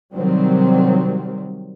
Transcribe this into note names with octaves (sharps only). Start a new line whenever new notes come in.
C3 D#3 F#3 G3 C4